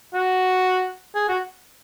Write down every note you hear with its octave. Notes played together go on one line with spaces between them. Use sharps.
F#4
G#4
F#4